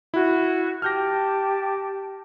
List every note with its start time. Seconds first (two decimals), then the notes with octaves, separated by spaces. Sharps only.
0.14 E4 F#4
0.82 G4 A5 F6 G6 A#6